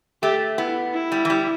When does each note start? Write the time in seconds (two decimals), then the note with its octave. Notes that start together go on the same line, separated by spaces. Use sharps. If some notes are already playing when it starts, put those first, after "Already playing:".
0.22 A3 G4
0.58 B3 E4
0.94 E4
1.12 G3
1.25 E3
1.30 G3